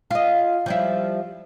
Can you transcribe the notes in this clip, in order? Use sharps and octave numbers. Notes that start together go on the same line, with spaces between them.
F4 D#5
F3 G3 E4